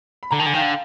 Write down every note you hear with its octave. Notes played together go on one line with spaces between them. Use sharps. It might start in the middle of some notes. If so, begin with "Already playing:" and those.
B5
D3 A#5
D#3 A5
D3 G#5
D#3 F5 G5
D3